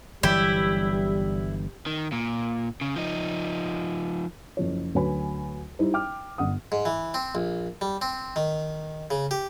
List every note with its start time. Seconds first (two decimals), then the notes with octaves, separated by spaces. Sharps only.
0.23 G1 E3 F#3 G3 E4 G4
1.86 D#3
2.12 A#2
2.81 C#3
2.96 F3 D#4
4.57 F#1 F3 C#5
4.95 D2 F#3 B4 C#5 G#5 B5
5.79 G3 D#4 E4 C5
5.94 G5 D6 F6
6.38 G1 F#5 D#6
6.72 G#2
6.86 E3
7.14 C4
7.35 A#1
7.81 G3
8.02 C4
8.36 D#3
9.11 C#3
9.31 G4